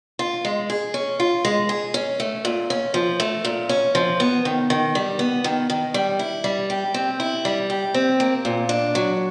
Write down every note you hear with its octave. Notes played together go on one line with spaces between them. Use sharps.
F4
G#3
G#4
C#4
F4
G#3
G#4
C#4
A3
A#2
C#4
F3
A3
A#2
C#4
F3
B3
D#3
D#3
G3
B3
D#3
D#3
G3
E4
G3
G4
C4
E4
G3
G4
C4
A#3
A#2
D4
F#3